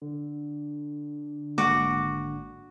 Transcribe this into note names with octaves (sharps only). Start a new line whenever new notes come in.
D3
G#1 G#3 A#3 F#4 D6